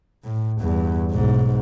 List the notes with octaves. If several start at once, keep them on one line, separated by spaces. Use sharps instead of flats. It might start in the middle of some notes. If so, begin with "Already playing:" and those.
A2
E2 G2
B1 G#2